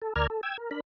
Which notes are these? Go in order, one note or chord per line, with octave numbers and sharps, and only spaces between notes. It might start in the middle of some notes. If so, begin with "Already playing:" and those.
A4
D2 A#4 D5 A#5 F6 G#6
A4
G5 E6 G#6
A#4
D4 A#4 B5